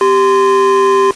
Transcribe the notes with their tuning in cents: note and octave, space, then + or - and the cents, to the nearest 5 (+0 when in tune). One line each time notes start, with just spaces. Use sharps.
G4 +0 C6 -20